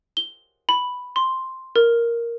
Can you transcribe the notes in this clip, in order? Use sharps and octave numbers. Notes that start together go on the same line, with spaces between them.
G7
B5
C6
A#4